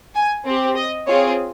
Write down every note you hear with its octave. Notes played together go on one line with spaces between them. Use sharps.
G#5
C4 G4
D#5
C4 F4 G#4 C#5